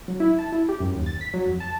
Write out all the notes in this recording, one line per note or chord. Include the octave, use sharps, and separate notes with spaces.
F#3
E4
A5
E4
G4
F#2
D#2
A6
B6
F#3
F2
A5